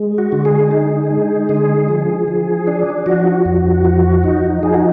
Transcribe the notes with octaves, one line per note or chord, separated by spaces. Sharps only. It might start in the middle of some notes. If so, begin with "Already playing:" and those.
Already playing: G#3
F#4
D3
G#4
D#4
G#3
D3 G#4
F3
F3
D4
F3 F#4
F2
F3
D#4
F3 G#4
F#4